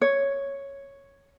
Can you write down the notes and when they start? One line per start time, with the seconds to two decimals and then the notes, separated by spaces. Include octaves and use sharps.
0.01 C#5